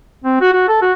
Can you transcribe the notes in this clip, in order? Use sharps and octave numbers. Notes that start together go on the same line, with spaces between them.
C4
F#4
F#4
A4
F#4